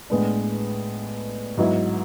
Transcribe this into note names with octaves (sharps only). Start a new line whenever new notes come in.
A2 G#3 B3 D4
G#2 F#3 B3 E4